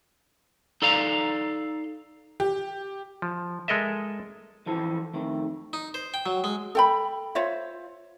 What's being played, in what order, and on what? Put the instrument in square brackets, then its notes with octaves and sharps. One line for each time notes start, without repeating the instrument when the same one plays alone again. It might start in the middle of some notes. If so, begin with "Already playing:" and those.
[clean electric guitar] D#4 A4 D5 F5 A#5
[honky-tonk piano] G4
[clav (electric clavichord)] F3
G#3 A4 A#4 D#5 E5
[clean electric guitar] E3 F3 A4
F2 D#3 A3
[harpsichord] D#4
C5
G5
F#3
G#3
[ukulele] A4 G5 B5
F4 C5 C#5 E5